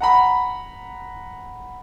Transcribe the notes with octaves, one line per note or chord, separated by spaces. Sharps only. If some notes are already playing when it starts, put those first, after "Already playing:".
F#5 A#5 B5